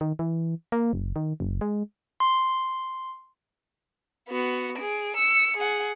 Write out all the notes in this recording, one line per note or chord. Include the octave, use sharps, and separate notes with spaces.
D#3
E3
A#3
F#1
D#3
F#1
G#3
C6
B3 F#4
G#4 D7
E6 C#7
G#4 F#5